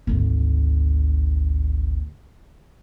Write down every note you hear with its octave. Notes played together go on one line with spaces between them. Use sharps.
G#1 D2